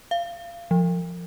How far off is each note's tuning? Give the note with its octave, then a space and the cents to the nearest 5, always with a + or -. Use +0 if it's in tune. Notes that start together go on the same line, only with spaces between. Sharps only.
F5 -25
F3 -15